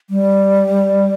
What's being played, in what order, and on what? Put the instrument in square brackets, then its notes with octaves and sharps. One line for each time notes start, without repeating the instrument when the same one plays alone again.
[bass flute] G3